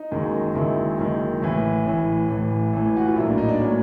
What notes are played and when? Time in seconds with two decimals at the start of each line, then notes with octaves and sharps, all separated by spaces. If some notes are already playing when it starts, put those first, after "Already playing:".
Already playing: D#4
0.11 F#1 F#2 D#3 G#3
0.55 F#1 F#2 D#3 G#3 E4
0.98 F#1 F#2 D#3 G#3
1.42 A1 A2 E3 E4
1.85 A1 A2 E3
2.28 A1 A2 E3
2.73 A1 A2 E3
2.97 F#4
3.06 F4
3.16 A#1 A2 F#3 A#3 E4
3.27 D4
3.38 D#4
3.49 D4
3.60 A2 F#3 A#3 C#4